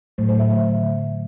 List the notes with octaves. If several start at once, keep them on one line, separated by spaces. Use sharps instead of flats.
A2 F#3 A3 C5
C5
E5
D3 F#3 A3 E5
D3 F#3 A3